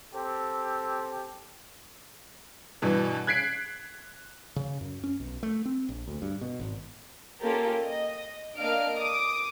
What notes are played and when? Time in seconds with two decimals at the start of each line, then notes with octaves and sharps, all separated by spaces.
0.14 C4 G4 A4
2.82 G2 B2 E3
3.27 F#6 G#6 B6 C7 D7
4.56 C#3
4.81 F#2
5.04 C#4
5.20 B1
5.43 A3
5.65 C4
5.89 A#1
6.08 D2
6.22 G2
6.41 B2
6.60 G#1
7.41 A#3 C#4 F4 G4 A4 A#4
7.85 D#5
8.58 A#3 D4 D#5 F5 F6 D7
8.96 D6 D#6